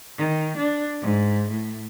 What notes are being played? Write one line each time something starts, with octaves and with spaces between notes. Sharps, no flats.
D#3
D4
G#2
A2